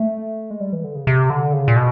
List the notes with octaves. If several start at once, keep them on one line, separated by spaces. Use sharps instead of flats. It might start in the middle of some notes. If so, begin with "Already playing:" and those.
Already playing: A3
G#3
G3
E3
D3
C#3
C3
D3
C#3
A#2
B2